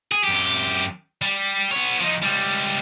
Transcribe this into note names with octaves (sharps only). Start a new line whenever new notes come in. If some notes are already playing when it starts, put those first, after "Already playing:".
G#4
F#2 G4
G3
B3 C#5
F3 D#4
C#2 G3